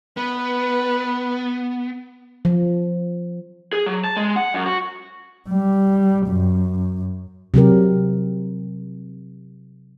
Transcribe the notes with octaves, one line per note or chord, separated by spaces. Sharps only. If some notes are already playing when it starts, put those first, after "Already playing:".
B3 B4
F3
G#4
F#3
A5
G#3
F#5
F#2
F#4
G3
F#2
C3 F#3 G4 A#4